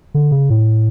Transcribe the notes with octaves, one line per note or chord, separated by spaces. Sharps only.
D3
C#3
A2